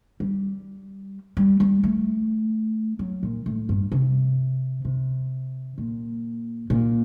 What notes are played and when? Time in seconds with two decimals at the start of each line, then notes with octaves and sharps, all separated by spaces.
0.20 G3
1.37 G3
1.60 G3
1.83 A3
2.99 F#3
3.23 A#2
3.46 A2
3.69 G2
3.92 C3
4.85 C3
5.78 A#2
6.70 A#2